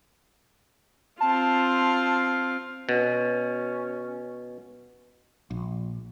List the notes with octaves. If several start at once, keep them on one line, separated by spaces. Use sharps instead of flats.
C4 F4 A5
B2 C#4
A#1